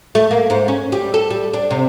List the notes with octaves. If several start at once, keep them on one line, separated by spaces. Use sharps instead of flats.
A3
A#3
G#2
C#4
G3
A4
G3
D4
C3